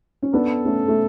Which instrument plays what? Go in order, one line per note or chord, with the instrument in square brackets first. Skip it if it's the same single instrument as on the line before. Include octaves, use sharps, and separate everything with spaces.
[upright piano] C#4
[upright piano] B3 D4 [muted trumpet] A4
[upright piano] A3 C#4
A3